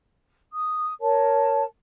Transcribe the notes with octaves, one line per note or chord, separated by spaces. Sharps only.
D#6
A#4 C#5 A5